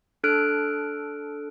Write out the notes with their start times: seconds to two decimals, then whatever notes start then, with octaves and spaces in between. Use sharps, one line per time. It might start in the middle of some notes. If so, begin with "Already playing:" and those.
0.24 D4 A4 F6 F#6 D7